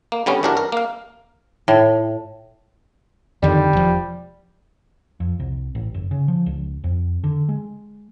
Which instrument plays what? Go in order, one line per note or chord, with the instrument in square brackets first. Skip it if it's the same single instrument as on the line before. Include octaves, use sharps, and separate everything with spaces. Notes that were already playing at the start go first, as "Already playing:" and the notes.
[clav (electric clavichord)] A#3
D3 G3 B3 C#4
G2 E3 D4 F#4 A#4
A#4
A#3 F5
[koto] A2
[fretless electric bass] F2 D3 D#3 [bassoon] G3
[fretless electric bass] E1 F3
[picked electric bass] F2
C2
A1
F#1
C#3
F3
C#2
F2
D3
G#3